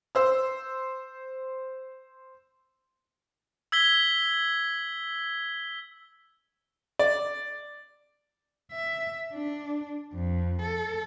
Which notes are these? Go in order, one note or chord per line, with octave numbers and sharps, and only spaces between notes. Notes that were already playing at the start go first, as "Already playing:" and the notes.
C5 E6
E6 G#6 B6 G7
D5
E5
D4
F2
A4